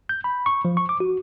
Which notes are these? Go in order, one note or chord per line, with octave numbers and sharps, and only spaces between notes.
G6
B5
C#6
F3
C#6
D6
F#4